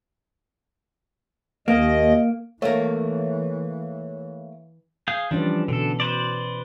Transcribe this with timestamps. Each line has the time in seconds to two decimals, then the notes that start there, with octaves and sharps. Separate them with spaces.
1.68 D#2 A#3 D#5
2.62 E3 A3 A#3 C#5 E5 F5
5.08 G#4 F5 G6
5.31 E3 F3 G3 C#4 D4 B4
5.68 B2 D3 A4
6.00 B4 C5 D5